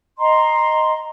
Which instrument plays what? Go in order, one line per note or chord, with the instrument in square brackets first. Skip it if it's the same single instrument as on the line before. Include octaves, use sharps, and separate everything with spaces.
[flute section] D#5 A#5 C6